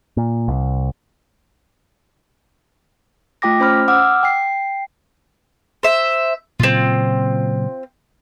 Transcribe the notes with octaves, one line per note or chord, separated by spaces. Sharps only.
A#2
C2
A3 F4 G5 D6 A#6
C#4 C5 B5 F6
F#5 D6 E6 F6
G5 C7
C5 E5
A#2 C#3 F#3 C4 F4